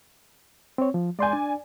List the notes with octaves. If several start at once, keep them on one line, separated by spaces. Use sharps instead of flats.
C4 C#5
F3
G#3 D5 G#5 C6 G6
D4